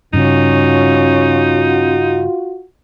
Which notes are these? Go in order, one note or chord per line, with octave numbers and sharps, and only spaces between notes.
G2 C#3 C#4 D#4 F4 F#4